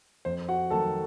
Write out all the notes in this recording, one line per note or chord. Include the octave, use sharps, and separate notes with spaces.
F2 C5
F#4 F#5
D#3 F#3 A3 A4 A5